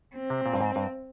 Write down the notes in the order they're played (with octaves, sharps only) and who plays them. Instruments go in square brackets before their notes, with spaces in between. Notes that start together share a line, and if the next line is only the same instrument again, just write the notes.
[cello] C4
[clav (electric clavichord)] C3
A#2
G2
G#2
G2